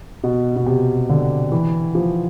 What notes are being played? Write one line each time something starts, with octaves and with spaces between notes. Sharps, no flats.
B2
B2
C3
D3
E3
F3